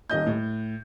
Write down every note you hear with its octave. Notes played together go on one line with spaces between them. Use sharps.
D#1 D#2 D#5 G6
A2